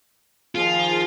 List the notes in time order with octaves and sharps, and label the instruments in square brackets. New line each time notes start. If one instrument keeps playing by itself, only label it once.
[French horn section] D#3 F3 G#4 [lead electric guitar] F4